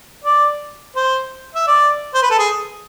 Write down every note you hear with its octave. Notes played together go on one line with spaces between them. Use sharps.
D5
C5
E5
D5
C5
B4
A4
G#4